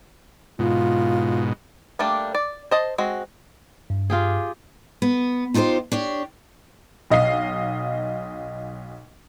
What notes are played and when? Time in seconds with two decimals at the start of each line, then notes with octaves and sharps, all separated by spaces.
0.59 G#2 B2 F4
1.99 G3 A3 A#3 D4 G4
2.35 D5
2.71 C5 D#5 A5
2.98 G#3 C4 F#4
3.90 G2
4.10 F4 G4 G#4
5.02 B3
5.54 D#4 F4 G4 A4 C5
5.92 D4 G4 C#5
7.10 B1 D#5 F5 C7